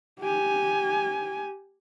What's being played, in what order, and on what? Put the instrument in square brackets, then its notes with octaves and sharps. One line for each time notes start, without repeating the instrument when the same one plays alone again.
[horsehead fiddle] G4 G#5